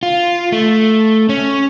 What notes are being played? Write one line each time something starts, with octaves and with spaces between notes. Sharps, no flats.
F4
A3
C#4